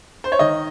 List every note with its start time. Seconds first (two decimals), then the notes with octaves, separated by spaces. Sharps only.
0.24 C5
0.32 C#5
0.39 D#3 D#5